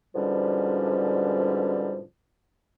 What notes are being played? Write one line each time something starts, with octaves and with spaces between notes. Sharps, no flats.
G#2 B2 D3 F3 G3 C#4